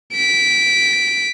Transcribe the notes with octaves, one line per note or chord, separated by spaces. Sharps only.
B6 D7